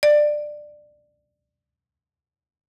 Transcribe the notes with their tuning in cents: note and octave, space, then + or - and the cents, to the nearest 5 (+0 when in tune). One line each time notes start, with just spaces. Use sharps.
D5 +15